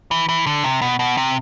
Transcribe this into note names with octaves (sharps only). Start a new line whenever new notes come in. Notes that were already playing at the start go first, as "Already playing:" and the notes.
E3
E3
D3
C3
B2
B2
C3